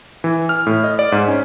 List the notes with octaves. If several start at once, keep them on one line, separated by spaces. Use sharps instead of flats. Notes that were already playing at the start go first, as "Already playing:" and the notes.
E3
F6
A2
D#5
D5
G#2
C#4